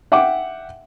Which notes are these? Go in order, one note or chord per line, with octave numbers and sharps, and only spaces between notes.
E5 F#5 G5 D6